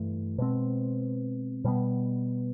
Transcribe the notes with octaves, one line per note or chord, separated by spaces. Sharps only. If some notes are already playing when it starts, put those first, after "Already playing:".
Already playing: G2 E3 A3
B2 G#3 C4
B2 G3 B3